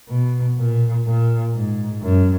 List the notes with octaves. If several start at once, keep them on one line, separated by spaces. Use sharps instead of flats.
B2
A#2
A#2
G#2
F#2